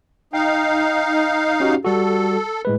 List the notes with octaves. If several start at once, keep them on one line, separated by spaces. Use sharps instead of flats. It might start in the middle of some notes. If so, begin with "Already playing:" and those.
D#4 F5 G5
C#4 F#4 G4
G3 F#4 A4
A2 G#3 B4